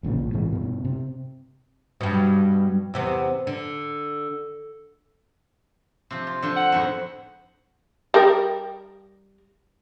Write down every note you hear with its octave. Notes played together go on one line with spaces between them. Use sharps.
D#1 A1 A#2 C#3
A#1 A#2
G#2 C3 E3 G#3
G2 B2
C3
G2 B2
E2 C3 B3
D3
C3 F3
F4
D3 F3
F#5
F2 G#2 B2
G3 A#4